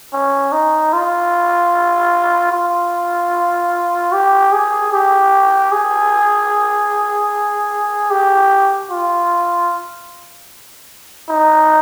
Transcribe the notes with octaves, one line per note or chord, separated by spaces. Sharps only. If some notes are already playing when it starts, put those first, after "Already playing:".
C#4
D#4
F4
F4
G4
G#4
G4
G#4
G4
F4
D#4